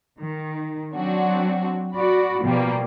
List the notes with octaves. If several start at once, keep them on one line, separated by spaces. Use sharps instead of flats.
D#3
F#3 C4 D4 F#4
F#4 D5 B5
B2 F3 G3 A#3